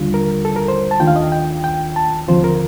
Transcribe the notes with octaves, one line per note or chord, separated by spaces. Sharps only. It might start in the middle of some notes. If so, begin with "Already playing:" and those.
Already playing: D#2 D3 G3 D4 F4
A#4
A4
A#4
C5
A5
D#2 D#3 A3 D4 F4 G5
F5
D#5
G5
G5
A5
D#2 D3 F3 C4 F4 C5
A#4